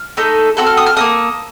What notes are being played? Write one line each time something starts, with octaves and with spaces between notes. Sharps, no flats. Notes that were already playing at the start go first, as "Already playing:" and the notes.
Already playing: F6
A3 D#4 A4
C4 D#4 F#4 A4 F#6
F6
D#6
F6
A#3 D#4 A4 D#6